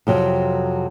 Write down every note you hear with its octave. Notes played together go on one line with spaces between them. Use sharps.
F2 C3 F#3